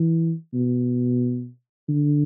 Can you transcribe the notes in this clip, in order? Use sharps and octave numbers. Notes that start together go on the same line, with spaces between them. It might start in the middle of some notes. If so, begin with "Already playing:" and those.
Already playing: E3
B2
D3